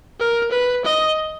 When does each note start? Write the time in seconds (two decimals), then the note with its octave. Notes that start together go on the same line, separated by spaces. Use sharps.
0.19 A#4
0.51 B4
0.85 D#5